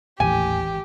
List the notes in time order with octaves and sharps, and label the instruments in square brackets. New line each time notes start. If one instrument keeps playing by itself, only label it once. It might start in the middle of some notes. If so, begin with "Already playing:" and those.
[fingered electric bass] G#1 E3 [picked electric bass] D#2 A2 A3 [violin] G4 [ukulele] G#5